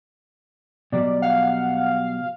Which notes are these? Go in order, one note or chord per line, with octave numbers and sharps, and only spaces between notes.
B2 F#3 G3 D5
F5 F#5